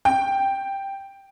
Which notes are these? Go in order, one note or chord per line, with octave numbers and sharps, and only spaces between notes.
G5